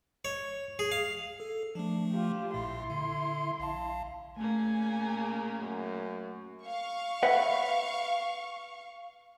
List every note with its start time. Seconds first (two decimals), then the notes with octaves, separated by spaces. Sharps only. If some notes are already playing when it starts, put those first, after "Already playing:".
0.25 C#5
0.79 G#4
0.92 F5
1.40 A4
1.75 F3 A3 D4
2.12 F4 G4
2.54 A#1 A#2 E4 C6
2.90 D3
3.60 A#1 F5 A5
4.36 A#2 C#3 A3 A#3 G#5
5.60 F#2
6.65 F5 C#6
7.23 B4 E5 F#5